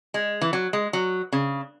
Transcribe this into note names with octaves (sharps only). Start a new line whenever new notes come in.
G#3
E3
F#3
G#3
F#3
C#3